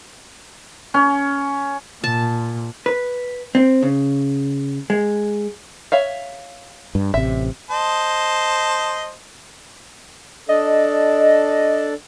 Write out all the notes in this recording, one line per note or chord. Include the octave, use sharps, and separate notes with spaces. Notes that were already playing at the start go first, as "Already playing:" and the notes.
C#4
A#2 A5
B4
C4
C#3
G#3
C#5 E5 F5
G2
A1 C3 E5
C5 D#5 A5
D4 A4 D5 D#5